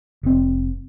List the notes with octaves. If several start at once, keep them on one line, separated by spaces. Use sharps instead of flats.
F1 C4